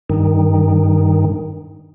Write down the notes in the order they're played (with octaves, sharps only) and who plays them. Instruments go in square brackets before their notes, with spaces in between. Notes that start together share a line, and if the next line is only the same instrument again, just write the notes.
[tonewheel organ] G2 D#3